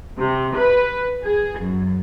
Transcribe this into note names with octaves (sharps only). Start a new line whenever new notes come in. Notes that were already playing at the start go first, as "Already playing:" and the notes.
C3
B4
G#4
F#2